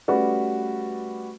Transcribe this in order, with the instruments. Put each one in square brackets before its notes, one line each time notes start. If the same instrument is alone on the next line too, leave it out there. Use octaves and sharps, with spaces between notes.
[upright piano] G3 A3 C#4 F#4 B4 D5